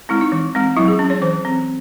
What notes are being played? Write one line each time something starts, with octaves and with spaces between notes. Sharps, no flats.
G#3 C4 E4
D#4
E3
G#3 C4
F#3 E4
G#4
C#4
C#5
E3 C5
C4